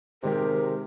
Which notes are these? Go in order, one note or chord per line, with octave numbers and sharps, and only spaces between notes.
C3 D#3 G#3 G4 A#4